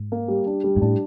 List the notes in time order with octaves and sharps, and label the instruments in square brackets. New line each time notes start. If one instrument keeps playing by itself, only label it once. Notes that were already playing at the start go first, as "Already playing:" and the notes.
Already playing: [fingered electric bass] G#2
[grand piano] A#3
G3
D4
G3
[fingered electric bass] G#2
[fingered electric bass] A2 [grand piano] D4